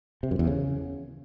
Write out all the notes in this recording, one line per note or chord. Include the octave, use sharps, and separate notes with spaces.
C3
F#2
E2
C#3